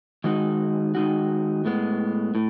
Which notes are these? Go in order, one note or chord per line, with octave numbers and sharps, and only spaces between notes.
D#3 G#3 D#4 F#4
D#3 G#3 D#4 F#4
A2 G#3 B3
A2